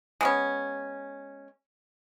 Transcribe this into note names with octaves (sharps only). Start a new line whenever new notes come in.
G#3 B3 C#4